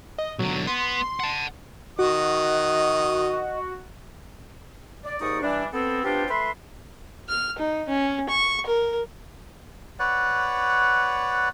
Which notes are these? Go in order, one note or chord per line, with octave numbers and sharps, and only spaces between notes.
D#5
B1 D3 F#3
B3 C6
F#5 A5
D#3 F#4 D#5 D#6
D5
D#2 G#2 D#4 D5 C#6 D#6
G2 E3 G3 D4
B3 C4 A4
B3 C4 D4 F4 G4
A3 B4 E5 C6
F6
D#4
C#4
C#6
A#4
B4 C#5 D5 F#5